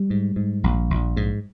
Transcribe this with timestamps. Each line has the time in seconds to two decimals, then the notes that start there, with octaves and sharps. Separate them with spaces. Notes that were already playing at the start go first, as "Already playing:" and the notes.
Already playing: G3
0.10 G#2
0.36 G#2
0.64 A#1
0.90 A#1
1.17 G#2